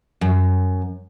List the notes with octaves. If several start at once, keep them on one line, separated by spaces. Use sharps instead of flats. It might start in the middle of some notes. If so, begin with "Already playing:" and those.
F#2